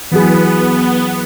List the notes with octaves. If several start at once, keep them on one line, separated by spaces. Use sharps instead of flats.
E3 F#3 B3 G#4